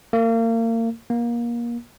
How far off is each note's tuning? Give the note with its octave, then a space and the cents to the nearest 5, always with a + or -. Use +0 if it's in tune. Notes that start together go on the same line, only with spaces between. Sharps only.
A#3 -35
A#3 +25